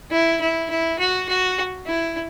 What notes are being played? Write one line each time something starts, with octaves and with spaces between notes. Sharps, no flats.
E4
E4
E4
F#4
F#4
E4